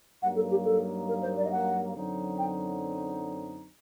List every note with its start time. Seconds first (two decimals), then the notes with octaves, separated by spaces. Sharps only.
0.22 G2 F#3 A#3 D#4 F#5
0.36 A4
0.50 G4
0.65 A4
1.08 A#4
1.22 C5
1.37 D5
1.45 D#5
1.51 F#5
1.95 F#2 D3 F#3 C4 D#4
2.39 G5